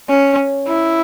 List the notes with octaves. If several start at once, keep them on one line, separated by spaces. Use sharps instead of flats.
C#4
E4